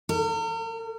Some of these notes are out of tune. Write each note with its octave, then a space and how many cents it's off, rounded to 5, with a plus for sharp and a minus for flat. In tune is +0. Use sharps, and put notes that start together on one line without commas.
A#4 -40